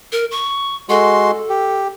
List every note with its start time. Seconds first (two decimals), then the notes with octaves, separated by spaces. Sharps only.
0.12 A#4
0.31 C#6
0.89 G#3 F#4 A4 C6
1.49 G4